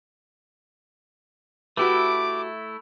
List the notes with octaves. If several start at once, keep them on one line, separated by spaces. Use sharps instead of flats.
A3 E4 F#4 G4 B4 D6